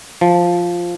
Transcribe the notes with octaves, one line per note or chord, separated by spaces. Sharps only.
F3